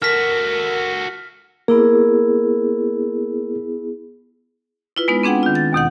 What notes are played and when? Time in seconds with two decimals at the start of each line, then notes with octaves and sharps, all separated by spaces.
0.02 F#4 A4 A#4 F6 B6
1.68 A#3 B3 E4 G#4 A#4
4.96 E4 F4 B4
5.08 G#3 B3 D#4 B4
5.23 C4 D4 G#4 F#5 G5
5.43 D#3 F4
5.55 A6
5.73 D#2 B2 D#3 F#5